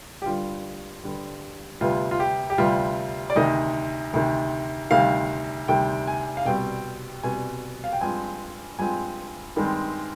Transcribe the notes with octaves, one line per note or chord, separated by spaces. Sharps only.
G4
G2 D3 G3 F4
G2 D3 G3
D2 C3 G3 B3 F4
F4
G4
G4
D2 C3 G3 B3 F4
D5
D2 C3 D#3 D#5
D2 C3 D#3
D2 C3 D#3 G3 F5
D2 C3 D#3 G3 G5
G#5
F5
C2 B2 G3 C4 G5
C2 B2 G3 C4 G#5
F5
G5
G2 F3 G#3 C4 G#5
G2 F3 G#3 C4 G#5
G2 D#3 G#3 C4